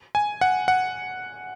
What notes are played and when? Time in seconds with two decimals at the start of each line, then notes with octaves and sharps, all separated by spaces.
0.15 G#5
0.41 F#5
0.68 F#5